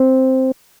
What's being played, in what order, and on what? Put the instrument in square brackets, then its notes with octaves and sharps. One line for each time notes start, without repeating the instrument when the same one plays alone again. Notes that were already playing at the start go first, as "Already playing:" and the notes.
Already playing: [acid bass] C4